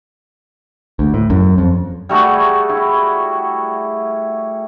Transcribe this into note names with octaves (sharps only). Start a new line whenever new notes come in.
D2
A2
F#2
F2
G3 A3 F#4 G#4
E4